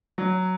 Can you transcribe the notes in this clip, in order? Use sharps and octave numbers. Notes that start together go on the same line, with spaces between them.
F#3